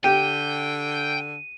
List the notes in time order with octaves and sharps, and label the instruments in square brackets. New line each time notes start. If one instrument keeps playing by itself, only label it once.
[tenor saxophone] D3 [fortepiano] G4 [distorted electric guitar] G5 [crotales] D#7